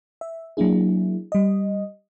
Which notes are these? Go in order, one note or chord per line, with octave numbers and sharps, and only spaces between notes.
E5
F#3 A#3 D4 E4 G#4
G3 D#5